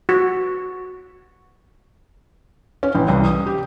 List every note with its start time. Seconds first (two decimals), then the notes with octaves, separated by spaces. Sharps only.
0.09 F#4
2.83 C#4
2.95 A1
3.08 C2
3.25 D#6
3.46 G4